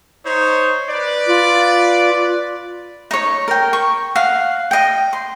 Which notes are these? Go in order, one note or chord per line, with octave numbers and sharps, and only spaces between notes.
D#4 C5 C#5
B4 D5
F4
D#4 C#5
A#4 G5
C#6
F5 F#5
D#5 G5
C6